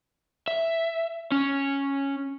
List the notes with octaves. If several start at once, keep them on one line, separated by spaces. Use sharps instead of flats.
E5
C#4